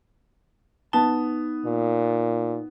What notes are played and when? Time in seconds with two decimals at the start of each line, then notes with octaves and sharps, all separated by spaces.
0.93 B3 D#4 A5
1.66 A#2